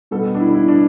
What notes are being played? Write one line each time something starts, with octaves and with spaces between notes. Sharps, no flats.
B2 G3 B3 A4
D4
E4
E4
D4